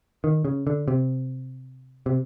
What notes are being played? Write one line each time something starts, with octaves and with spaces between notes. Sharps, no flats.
D#3
C#3
D3
C3
C3